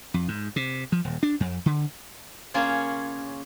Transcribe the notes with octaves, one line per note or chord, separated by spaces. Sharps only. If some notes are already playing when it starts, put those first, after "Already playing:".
F2
G#2
C3
F3
D#1
D4
F2
D3
C#3 A#3 C#4 F4 G#4 C#5